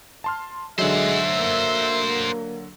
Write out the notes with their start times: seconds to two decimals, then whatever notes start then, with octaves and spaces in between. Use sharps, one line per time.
0.24 A5 C6 F6
0.78 D3 F#3 G#3 C5 E5 F#5
1.39 A#3